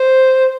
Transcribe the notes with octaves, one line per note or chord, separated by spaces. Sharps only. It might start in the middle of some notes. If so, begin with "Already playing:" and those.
Already playing: C5